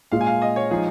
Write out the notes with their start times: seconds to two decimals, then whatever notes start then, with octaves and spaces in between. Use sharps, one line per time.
0.12 A#2 G#3 F4 F5
0.21 G#5
0.27 F5
0.42 D#5
0.56 C#5
0.71 F3 G#3 D#4 G#4